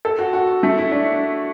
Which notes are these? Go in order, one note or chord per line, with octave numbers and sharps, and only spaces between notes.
A4
F#4
F#4
A3
E4
D4